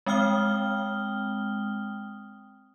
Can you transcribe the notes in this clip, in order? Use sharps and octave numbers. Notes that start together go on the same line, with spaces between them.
G#3 C4 G5 D#6 F6 G7